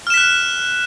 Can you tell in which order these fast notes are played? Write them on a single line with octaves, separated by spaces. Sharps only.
F6 E7 B6 F#6